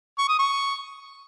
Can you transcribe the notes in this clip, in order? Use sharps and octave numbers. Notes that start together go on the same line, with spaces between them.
C#6
D#6
C#6